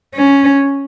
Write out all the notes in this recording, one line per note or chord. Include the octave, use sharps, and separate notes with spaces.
C#4